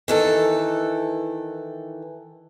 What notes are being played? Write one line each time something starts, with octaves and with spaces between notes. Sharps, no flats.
D#3 E3 A4